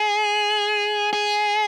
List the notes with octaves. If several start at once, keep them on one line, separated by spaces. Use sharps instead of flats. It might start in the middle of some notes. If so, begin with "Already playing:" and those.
Already playing: G#4
G#4